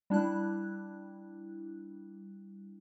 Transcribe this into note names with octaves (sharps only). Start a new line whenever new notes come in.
G3 D4 E4 F#6